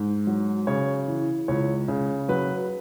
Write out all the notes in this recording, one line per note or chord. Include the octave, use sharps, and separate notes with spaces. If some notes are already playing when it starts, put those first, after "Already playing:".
Already playing: G#2
F#3
C#3 C#5
E3
C#2 C#5
C#3
F#3 B4